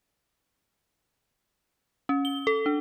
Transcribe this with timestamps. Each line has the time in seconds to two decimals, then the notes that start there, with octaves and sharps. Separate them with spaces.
2.09 C#4
2.25 G7
2.47 A4
2.66 D4